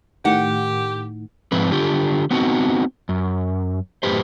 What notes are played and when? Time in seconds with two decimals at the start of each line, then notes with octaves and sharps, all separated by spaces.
0.25 A2 D#3 G4 F#5
1.52 G#2 F3 C4 B4
1.71 D3 F4 G4
2.31 B3 C4 D#4 F#4
3.09 F#2
4.03 F#2 A2 G4 B4 C5